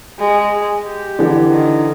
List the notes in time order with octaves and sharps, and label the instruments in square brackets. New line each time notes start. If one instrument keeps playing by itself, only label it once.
[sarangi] G#3
G4
[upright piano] D3 E3
[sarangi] D#3